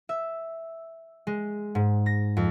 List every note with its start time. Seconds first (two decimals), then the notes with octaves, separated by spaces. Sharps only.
0.09 E5
1.27 G#3
1.75 G#2
2.06 A#6
2.37 F2